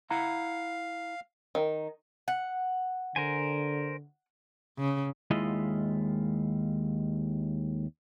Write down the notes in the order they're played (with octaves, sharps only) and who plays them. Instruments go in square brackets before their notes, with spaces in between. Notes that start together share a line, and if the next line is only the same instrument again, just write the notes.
[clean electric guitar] E4 F#5 A#5 [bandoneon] F5
[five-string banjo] D#3
[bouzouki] F#5
[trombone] D3 [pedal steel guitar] A#4 C5 G#5
[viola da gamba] C#3
[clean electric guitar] D#2 G#3 E4 F4 D#5